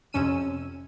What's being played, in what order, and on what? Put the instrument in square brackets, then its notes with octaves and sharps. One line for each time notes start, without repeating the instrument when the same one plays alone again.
[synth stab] F2 C3 C#4 E6 D#7